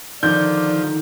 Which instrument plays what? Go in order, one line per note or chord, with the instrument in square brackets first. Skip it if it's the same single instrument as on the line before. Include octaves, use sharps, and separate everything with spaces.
[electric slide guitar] D3 D#3 [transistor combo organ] F3 [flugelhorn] D5 [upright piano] G6